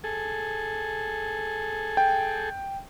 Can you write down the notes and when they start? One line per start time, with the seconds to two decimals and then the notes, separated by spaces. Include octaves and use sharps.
0.04 G#4 A4
1.97 G5